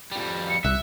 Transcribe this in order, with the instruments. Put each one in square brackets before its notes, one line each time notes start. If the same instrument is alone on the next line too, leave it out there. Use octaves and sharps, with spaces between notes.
[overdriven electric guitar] F2 G3
[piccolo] C#7
[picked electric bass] C2 [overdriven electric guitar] E5 [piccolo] F#6